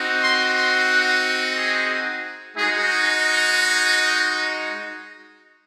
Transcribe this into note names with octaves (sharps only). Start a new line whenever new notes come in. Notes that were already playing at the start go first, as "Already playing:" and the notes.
Already playing: C4 D#4 F#4
C6
C6
F#5
G#4
G#3 D#4 F#4 G#4